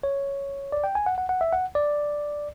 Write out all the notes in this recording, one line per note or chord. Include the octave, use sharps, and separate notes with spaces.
C#5
D5
G5
G#5
F#5
F#5
F#5
E5
F#5
D5